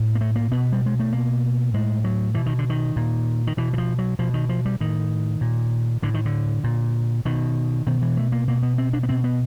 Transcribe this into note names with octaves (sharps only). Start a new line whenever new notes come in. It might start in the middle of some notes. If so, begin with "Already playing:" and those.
Already playing: A2
A#3
A3
A#3
B2 B3
G3
G#3
A3
B2 A#3
A2 G#3
F#3
B2 E3
D#3
D3
D#3
A#2
D#3
B2 E3
E3
F3
F#3
B2 F3
D#3
F3
G3
A2 D#3
A#2
A2 D3
D#3
D3
A#2
B2 D#3
B2 D#3
E3
A3
A#3
B2 A#3
B3
C4
D4
B3
B2 C4
B3